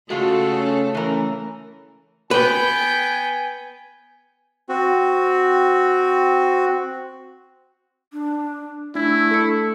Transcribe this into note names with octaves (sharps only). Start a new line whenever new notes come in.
C#3 G#3 A3 F4 F#4 A4
C#4
E3 C#4 A#4
B3 B4 G5 G#5
C4 F#4
D4
A3 D4 E4
A4 C#7